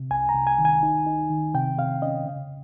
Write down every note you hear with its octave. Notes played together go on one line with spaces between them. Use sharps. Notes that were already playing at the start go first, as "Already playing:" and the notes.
Already playing: C3
C2 G#5
A#5
C2
G#5
D#3
G#5
D#4
D#4
D#3
C3 G5
C3 F5
C#4 D#5
C#3